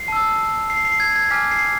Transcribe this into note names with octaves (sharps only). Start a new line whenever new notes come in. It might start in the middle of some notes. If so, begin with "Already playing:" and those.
Already playing: C7
A5 E6
C7
C7
G#6
G#6
G#5 D6 F6 B6
C7